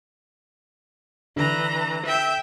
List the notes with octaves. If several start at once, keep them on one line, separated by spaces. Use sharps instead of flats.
D3 E3 A#5
E5 G5